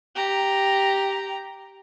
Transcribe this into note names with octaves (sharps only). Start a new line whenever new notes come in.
G4 A#5